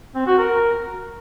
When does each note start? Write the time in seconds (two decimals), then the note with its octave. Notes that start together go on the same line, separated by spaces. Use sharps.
0.15 C4
0.26 F#4
0.38 A#4